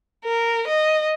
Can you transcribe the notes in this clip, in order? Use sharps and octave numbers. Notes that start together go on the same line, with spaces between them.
A#4
D#5